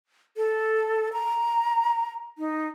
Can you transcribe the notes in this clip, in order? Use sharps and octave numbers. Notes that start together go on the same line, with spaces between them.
A4
A#5
D#4